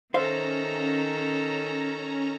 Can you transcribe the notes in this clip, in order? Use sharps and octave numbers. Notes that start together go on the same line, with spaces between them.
D#3 C#4 A4 C5 E5 F5 A#5